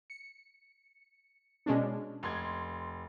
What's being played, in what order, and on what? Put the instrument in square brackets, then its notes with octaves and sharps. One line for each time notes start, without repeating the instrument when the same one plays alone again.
[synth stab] C#7
B2 G#3 C#4 D4
[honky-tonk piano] F1 C6 G#6